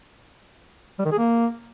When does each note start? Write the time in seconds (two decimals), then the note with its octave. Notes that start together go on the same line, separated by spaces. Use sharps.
0.99 G3
1.05 D#3
1.12 G#4
1.18 A#3